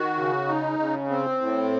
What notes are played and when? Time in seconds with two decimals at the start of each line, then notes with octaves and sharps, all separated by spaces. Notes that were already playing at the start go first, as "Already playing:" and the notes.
Already playing: D#3 F#4
0.17 C#3
0.48 D#4
0.79 C#3
1.10 C4
1.41 A2